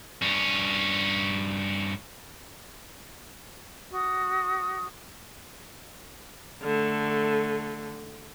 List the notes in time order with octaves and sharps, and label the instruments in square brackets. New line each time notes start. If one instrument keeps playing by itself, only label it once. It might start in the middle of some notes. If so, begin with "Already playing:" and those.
[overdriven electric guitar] G2 C#4
[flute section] F#4 D#6
[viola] D3 A3